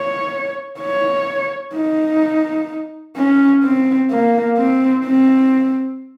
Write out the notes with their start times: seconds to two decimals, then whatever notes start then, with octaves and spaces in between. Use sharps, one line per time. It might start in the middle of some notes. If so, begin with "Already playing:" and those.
Already playing: C#5
0.80 C#5
1.74 D#4
3.17 C#4
3.63 C4
4.11 A#3
4.57 C4
5.05 C4